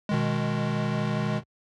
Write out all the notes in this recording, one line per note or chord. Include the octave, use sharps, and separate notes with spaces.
B2 D#3 G#3